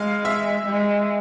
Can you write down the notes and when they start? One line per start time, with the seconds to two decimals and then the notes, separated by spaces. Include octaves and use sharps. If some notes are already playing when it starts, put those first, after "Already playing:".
Already playing: G#3 F5
0.25 E5
0.66 G#3